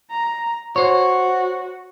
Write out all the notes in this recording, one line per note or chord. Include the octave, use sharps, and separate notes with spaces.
A#5
F#4 C5 C#5